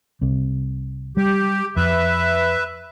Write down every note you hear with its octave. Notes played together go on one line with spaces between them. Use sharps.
C2 C3
G3 G4
F2 B4 E5